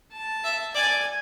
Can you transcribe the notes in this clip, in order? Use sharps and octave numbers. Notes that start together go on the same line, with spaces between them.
A5
E5
D5 G#5